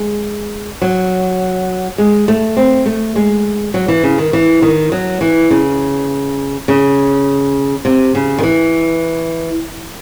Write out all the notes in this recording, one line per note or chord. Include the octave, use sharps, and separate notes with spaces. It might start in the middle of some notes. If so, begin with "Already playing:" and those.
Already playing: G#3
F#3
G#3
A3
C4
A3
G#3
F#3
E3
C#3
D#3
E3
D#3
F#3
E3
C#3
C#3
C3
C#3
D#3
E3